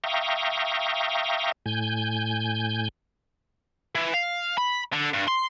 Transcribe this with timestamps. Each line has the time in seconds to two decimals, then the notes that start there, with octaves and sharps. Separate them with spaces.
0.04 E5 F5 G5 A#5 C#6 D#6
1.66 A2 G#5 G6
3.95 E3
4.14 F5
4.58 B5
4.93 D3
5.13 G2
5.27 C6